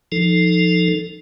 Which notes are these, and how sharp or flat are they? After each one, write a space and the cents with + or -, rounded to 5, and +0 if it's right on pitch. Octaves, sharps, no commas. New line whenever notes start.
F3 +0 D#4 +0 A4 +0